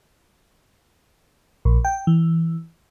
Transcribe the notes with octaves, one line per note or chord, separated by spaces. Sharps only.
A#1
G5
E3